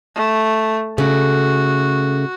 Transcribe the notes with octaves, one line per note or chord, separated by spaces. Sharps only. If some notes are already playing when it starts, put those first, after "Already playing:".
A3
C#3 A3 F#4